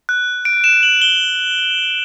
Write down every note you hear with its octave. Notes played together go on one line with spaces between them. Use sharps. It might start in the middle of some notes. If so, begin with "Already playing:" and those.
F#6
D7
E7
F#7
G7